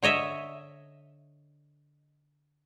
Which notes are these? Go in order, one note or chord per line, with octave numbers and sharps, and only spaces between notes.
D3 C#5 D#5 E5